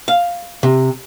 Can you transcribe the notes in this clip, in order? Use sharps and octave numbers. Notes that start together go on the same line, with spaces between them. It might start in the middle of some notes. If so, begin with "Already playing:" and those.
F5
C3